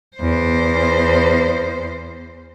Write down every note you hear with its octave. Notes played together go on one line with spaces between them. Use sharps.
E2 C5